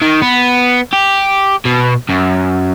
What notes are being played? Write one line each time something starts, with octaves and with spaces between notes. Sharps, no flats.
D#3
B3
G4
B2
F#2